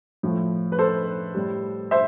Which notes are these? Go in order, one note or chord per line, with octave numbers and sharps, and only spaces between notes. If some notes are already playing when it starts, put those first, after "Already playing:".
A2 F3 A3
B4
A4 C5
A2 G3
C5 E5